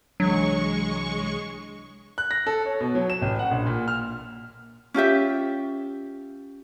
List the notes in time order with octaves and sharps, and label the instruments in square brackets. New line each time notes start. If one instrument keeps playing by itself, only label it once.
[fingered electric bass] C2 E3 D4 [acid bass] F#3 [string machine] G#3 C#6
[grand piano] F#6
A#6
A4
C#5
B2
F#3
E7
A1
F#5
A#1
A#2
F6
[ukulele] C#4 F4 G4 E5